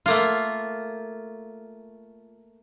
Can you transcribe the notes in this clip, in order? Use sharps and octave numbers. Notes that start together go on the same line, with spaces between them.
A3 A#3 F4